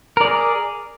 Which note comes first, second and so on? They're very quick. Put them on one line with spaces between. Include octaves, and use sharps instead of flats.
A#4 D5 G#4